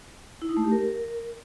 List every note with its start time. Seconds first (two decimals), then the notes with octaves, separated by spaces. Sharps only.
0.42 E4
0.49 D#4
0.57 A3
0.64 G4
0.72 A#4